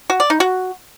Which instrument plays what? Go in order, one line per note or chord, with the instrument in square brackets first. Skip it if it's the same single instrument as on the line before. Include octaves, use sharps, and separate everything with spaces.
[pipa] F#4
D5
D#4
F#4